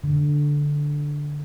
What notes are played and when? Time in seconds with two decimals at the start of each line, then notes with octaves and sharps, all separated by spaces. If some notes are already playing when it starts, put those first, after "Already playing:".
0.04 D3